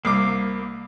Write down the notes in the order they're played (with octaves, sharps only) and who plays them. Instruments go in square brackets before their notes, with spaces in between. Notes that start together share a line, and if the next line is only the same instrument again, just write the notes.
[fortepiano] C2 D6 [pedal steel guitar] A#3 F5